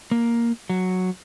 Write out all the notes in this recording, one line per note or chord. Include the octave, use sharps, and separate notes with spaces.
A#3
F#3